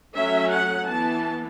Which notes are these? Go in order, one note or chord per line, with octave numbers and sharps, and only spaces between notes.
F#3 A3 C#4 E5
F#5
E3 B3 A5